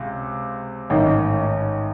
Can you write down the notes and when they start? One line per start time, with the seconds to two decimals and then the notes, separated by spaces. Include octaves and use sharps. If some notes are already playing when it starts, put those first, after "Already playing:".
Already playing: C#2 C3
0.90 A1 G#2 D#3